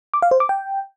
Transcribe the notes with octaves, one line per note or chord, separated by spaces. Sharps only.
D6
F5
C5
D6
G5